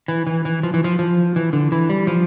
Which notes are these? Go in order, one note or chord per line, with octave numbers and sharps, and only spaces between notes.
E3
E3
E3
F3
E3
F3
F3
E3
D3
E3
G3
F3